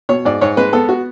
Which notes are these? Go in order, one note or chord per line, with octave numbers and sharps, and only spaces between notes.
B2 C#5
G#2 D5
G#2 C#5
G#3 B4
B3 A4
F#4